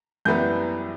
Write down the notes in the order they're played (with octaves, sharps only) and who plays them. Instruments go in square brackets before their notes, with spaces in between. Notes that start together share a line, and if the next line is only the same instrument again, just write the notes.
[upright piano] F#2 E3 G3 B3 G6